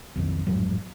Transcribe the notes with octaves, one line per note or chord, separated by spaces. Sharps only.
B1 F2 D#3
A1 F2 G#2 F#3